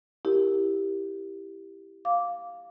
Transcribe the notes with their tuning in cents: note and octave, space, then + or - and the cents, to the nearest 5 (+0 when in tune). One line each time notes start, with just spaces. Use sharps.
E4 +0 G4 +0 A#4 +0
F5 +5 D6 -5